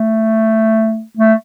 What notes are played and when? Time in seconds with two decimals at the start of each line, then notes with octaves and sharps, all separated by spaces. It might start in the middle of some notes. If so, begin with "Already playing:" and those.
Already playing: A3
1.17 A3